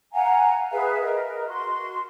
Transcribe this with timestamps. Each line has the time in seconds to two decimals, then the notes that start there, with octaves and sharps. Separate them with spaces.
0.12 F5 F#5 G#5 A#5
0.71 G#4 B4 E5 F5
1.01 A#4 D#5
1.46 F#4 C6